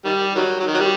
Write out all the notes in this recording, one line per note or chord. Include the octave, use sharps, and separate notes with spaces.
D#3 G3
D#3 F#3
F#3
D#3
F#3
G3